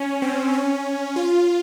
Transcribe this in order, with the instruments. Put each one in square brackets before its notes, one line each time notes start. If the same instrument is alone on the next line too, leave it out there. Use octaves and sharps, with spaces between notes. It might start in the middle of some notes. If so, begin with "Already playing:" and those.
Already playing: [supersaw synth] C#4
C4
C#4
F4